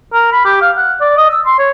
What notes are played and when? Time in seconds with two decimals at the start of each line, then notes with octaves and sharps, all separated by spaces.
0.13 A#4
0.32 B5
0.45 G4
0.62 F5
0.77 F#5
1.01 D5
1.17 D#5
1.30 E6
1.46 C6
1.58 C#5